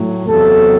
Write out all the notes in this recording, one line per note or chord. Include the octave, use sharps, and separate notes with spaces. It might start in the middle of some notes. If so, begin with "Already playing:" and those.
Already playing: A2 F#3
E2 C3 F#3 A4